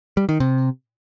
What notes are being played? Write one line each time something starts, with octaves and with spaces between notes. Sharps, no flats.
G3
D#3
C3